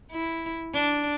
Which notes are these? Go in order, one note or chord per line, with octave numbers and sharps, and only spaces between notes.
E4
D4